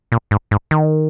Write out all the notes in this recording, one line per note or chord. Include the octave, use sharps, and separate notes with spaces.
A#2
G#2
G#2
D#3